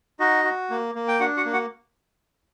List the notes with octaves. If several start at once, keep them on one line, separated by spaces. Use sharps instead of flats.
D#4 F#4 D#5
F#4
A#3
A#3
G5
D4 F#4 F#5
F#4 F#5
A#3
F#4 F#5